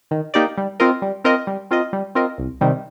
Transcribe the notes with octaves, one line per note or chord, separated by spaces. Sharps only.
D#3
A#3 D#4 G4 D5
G3
C4 F4 A#4 D#5
G3
C4 F4 A#4 D#5
G3
C4 F4 A#4 D#5
G3
C4 F4 A#4 D#5
C2
C3 D#3 G3